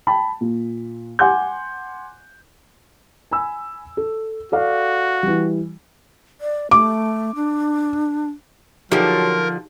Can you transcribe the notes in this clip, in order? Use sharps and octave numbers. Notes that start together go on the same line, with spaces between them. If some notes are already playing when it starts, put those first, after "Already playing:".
G5 A5 B5
A#2
F#5 G#5 C6 D6 G6
G#5 B5 E6
A4
F#4 A4 D5 F5
E3 G3
D5
A3 D6
D4
D3 F3 F#3 D#4 G4 G#4 A#4